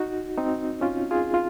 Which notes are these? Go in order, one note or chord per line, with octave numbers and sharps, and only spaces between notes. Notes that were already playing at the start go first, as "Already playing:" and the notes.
Already playing: D#4 F#4
C4 D#4
C#4 F4
F4 G#4
F4